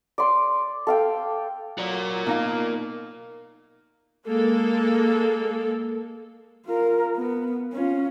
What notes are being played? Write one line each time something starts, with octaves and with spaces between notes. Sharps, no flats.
D5 C6 D6
A4 F5 G5
F#3 A#4 D5
B2 A#3 D#4 F5
G#3 A#3 A4
F4 A#4
B3
C#4 F4